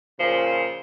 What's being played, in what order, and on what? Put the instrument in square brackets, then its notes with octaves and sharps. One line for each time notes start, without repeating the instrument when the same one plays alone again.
[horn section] A#2 C#3 F3